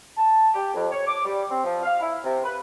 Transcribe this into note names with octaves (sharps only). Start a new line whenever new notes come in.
A5
G4
F2
C#5
D6
G3
C4
F3
F5
E4
C3
B4